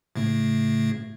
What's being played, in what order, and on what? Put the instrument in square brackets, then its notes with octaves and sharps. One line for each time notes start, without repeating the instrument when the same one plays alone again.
[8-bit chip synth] A2 C#3 A3